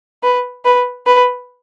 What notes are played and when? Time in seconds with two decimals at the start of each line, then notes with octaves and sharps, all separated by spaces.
0.23 B4
0.65 B4
1.06 B4